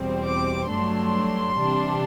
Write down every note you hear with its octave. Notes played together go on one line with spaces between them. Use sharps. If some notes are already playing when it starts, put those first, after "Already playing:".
Already playing: E2 B2 G3 C4
D6
G2 F#3 A3 D4 C6
C3 E3 G3 D4